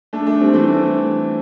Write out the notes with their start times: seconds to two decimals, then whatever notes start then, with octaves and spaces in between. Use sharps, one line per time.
0.13 A3 D4
0.26 A3 D4
0.40 G3 C4
0.53 E3 A3